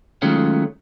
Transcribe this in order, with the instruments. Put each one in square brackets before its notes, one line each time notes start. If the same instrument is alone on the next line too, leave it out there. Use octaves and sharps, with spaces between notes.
[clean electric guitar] D#3 F#3 G#3 A3 C#4 F4